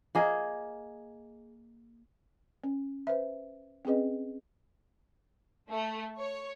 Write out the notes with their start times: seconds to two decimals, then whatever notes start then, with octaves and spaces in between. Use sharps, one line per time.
0.15 A#3 G#4 D#5
2.64 C#4
3.07 B4 C5 E5
3.85 C4 C#4 G#4 B4 D#5
5.70 A3
6.19 C#5